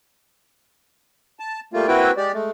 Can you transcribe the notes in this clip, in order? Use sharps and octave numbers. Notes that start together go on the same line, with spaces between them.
A5
G3 A3 A#3 F4
A#3 C4 E4 F#4 B4 G5
G#3 G4 D5
G#3 A3